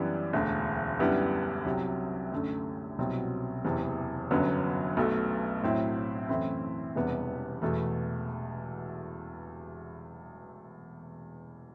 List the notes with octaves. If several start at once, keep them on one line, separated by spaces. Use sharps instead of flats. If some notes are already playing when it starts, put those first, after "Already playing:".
Already playing: F#2 E3 G3 B3 D4
E1 D2 D3
F#2 D3 G3 B3 E4
C2 C3 F#3
F#2 D3 A3
C2 B2 F#3 C4
F#1 E2 C3 E3
G1 F#2 D3 F#3 B3
B1 B2 A3
A2 F#3 C4 E4
F#2 E3 A3 C4 E4
E1 E2 C3 G3 B3
E1 E2 B2 A3